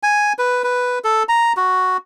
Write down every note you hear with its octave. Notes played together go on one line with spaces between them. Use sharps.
G#5
B4
B4
A4
A#5
F#4